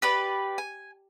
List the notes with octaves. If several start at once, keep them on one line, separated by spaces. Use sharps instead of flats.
G4 B4 D5
G#5